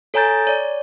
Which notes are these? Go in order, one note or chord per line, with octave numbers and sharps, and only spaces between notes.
A4 C#5 G#5 A#5 G6 A6
C#5 D5